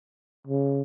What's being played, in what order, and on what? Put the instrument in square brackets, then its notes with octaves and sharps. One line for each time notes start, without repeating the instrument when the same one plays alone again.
[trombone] C#3